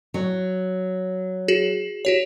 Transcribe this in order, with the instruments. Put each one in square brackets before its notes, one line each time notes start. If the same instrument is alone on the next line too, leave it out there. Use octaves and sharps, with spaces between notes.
[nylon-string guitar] F#3
[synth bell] F#4 G#4
F#4 G4 C#5